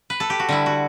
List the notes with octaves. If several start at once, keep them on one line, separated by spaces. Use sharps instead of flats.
B4
A4
G4
F#4
D3 G3 E4
F#4